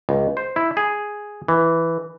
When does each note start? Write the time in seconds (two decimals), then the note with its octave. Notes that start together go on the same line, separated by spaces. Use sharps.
0.09 C#2
0.37 C5
0.56 E4
0.77 G#4
1.48 E3